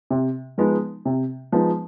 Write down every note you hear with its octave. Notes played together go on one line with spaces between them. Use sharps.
C3
F3 G#3 B3 D#4
C3
F3 G#3 B3 D#4